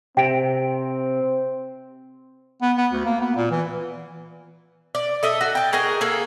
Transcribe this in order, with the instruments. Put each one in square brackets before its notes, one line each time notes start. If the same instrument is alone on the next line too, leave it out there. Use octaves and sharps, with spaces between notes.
[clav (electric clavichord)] C3 [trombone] C4 [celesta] G5 D7
[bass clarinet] B3
B3
D2
A#3
B3
A#2
E3
[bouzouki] D5
A4 D#5 E5
F#4
G5 A5
F#4 G#4 A#4 D#5
A#3 G#4 A4